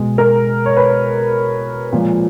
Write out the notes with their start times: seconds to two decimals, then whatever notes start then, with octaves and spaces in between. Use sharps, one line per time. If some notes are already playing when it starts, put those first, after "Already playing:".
Already playing: B2 G#3
0.18 A#4
0.66 C#5
0.77 B4
1.93 A#2 F3 G#3